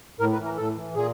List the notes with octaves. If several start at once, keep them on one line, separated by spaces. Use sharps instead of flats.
A2 A#4
B4
E3
A#4
A2 A4
E3
A#2 G#4